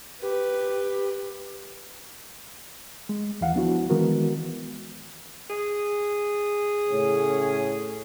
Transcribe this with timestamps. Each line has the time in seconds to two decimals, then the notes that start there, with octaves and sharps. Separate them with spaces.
0.22 G4 B4
3.09 G#3
3.41 D#2 E3 F5 F#5
3.55 F3 B3 D4 E4 F#4
3.90 D#3 E3 G#3 B3 F#4 A#4
5.50 G#4
6.90 A2 C#3 C#4